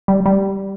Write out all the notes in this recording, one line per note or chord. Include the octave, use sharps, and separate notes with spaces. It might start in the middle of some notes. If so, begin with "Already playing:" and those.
G3
G3